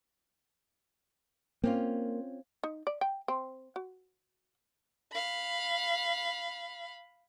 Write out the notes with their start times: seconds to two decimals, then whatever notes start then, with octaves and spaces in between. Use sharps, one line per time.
1.64 A#3 C4 C#4 F4
2.64 D#4
2.87 D5
3.01 G5
3.28 C4
3.76 F#4
5.13 F5 B5